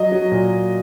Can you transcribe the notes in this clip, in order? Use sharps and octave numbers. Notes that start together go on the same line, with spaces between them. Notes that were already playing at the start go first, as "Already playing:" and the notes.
Already playing: F#3 D#5
F#3
A#2